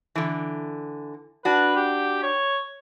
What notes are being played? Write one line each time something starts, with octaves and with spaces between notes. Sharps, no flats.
D3 E3
D4 F#4 B4
G4
C#5